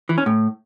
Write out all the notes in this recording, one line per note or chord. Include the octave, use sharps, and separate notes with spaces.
E3
C#4
A2